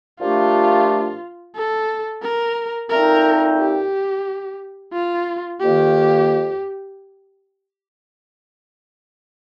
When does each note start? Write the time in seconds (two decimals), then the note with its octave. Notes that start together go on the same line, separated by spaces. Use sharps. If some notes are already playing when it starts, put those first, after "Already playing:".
0.20 A#2 F3 A3 D4 F4 G4
1.55 A4
2.22 A#4
2.90 A#2 A3 C4 D#4 A#4
3.58 G4
4.93 F4
5.60 F2 D#3 A#3 G4